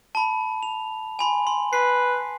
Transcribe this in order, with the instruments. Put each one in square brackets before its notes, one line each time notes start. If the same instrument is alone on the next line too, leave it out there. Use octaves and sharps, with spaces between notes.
[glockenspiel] A5 B5
F7
G#5 B5 C6
C6
[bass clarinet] B4 [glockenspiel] C7